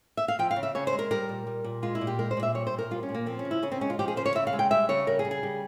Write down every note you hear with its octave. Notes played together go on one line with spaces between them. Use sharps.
E5
F5
F3 G5
F5
C#3
E5
C#3 C#5
C5
G#3
A#4
G3 A#4
A#2
G3
A#2
G#3 F4
E4
A#2
G4
G#3 A#4
C5
A#2
E5
G3 C#5
C5
A#2
A#4
G3 F4
C#4
A#2
A#3
F3 C4
C#4
C#3
E4
C#3 C#4
C4
G#3 C#4
F4
F3 G4
G#4
C#3 C5
C#5
C#3 E5
F5
G#3
G5
G3 E5
C#3 C#5
G3 A#4
G#4
C#3
G#4
G3